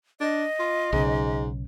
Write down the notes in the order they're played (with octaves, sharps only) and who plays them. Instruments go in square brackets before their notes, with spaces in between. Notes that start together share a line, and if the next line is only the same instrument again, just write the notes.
[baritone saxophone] D4 [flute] D#5
[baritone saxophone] F4
[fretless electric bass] B1 C#3 [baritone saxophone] G#2